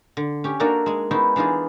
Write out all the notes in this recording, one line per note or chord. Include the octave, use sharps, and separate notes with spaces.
D3
C#4 G4
A#3 D4 D#4 F#4 A4 A#4
G#3 G#4
B3 C#4 D#4 E4 C5
E3 D4 D#4 F4 G#4